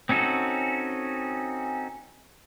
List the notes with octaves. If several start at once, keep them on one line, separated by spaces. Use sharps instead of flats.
C4 C#4 D#4 F#4 A4